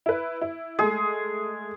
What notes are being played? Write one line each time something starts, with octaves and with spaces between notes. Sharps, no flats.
E4 B4
E4
G#3 A3 G#4